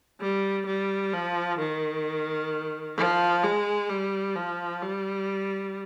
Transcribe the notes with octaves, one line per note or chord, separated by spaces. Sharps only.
G3
G3
F3
D#3
F3
G#3
G3
F3
G3